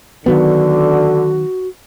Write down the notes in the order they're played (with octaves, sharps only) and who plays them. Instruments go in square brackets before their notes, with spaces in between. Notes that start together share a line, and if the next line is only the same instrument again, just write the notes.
[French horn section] D3 [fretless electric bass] D#3 F#3 B3 [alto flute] F#4